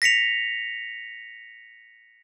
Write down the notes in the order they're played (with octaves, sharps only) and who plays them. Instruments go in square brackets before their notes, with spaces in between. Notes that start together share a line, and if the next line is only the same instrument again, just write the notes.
[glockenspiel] A#6 B6 C#7 F7